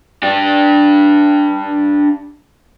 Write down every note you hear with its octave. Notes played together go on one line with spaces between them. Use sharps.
D4 G4